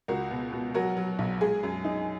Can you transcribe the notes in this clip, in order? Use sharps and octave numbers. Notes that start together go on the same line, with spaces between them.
C#2 F#4 A#4
B2
B2
F#3 F#4 A#4
F#3
B1
G#3 G#4
F#2
D#4